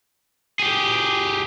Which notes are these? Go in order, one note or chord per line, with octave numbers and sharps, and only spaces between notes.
G4 G#4